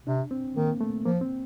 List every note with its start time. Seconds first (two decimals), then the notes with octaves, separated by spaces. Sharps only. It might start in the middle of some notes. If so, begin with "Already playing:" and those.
0.07 C3 D4
0.31 C4
0.56 D#3 A#3
0.81 A3
1.05 F3 A#3
1.21 C4